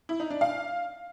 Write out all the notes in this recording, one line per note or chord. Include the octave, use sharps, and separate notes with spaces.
E4
D#4
D4
F5